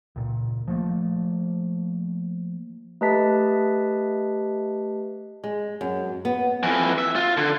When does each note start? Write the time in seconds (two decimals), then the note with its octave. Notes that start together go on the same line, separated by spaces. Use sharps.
0.16 C#2 A#2
0.68 F3 F#3 A3 A#3
3.01 A3 G4 B4 D#5 A5 B6
5.44 G#3
5.81 F#2
6.25 B3
6.63 F2 E3
6.98 E5
7.16 F4
7.37 D3